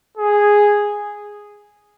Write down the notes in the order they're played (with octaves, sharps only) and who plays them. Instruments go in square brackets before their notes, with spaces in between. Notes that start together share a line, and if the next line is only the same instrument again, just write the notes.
[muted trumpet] G#4